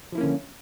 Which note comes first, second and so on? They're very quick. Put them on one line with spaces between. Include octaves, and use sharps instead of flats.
F3 E4 A#3 C#4 D3